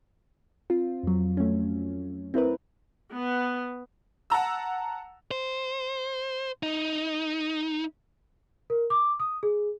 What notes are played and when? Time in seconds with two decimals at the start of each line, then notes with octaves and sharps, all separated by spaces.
0.70 C4 F4
1.03 F2 F#3
1.37 A3 C#4
2.34 C4 E4 A#4 B4
3.13 B3
4.30 F#5 A5 A#5 E6
5.31 C5
6.63 D#4
8.70 A#4
8.90 D6
9.20 D#6
9.43 G#4